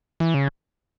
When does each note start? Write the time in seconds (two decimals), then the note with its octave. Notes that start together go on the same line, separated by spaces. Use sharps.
0.20 E3
0.34 C#3